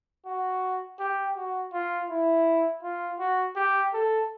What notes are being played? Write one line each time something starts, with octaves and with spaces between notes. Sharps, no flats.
F#4
G4
F#4
F4
E4
F4
F#4
G4
A4